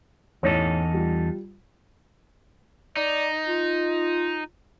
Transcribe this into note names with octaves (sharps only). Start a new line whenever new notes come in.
A1 E2 D#4 A4 C#5
G3 F4
D#4 D5
F4